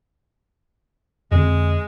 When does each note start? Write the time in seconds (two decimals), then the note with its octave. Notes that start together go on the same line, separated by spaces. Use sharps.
1.31 F2 D3 G#3 C4